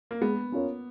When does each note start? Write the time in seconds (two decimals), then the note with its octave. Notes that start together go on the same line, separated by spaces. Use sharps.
0.11 A#3
0.21 G#3 B3
0.52 C#4 F4 A#4 C#5